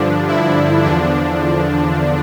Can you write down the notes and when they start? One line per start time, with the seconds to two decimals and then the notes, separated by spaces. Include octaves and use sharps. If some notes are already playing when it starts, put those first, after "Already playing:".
Already playing: G2 D3 F3 D4
0.27 E4
0.83 E2 D3 F3 D4